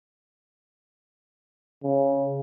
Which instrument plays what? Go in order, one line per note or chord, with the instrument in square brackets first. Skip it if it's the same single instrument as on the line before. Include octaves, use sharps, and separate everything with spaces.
[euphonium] C#3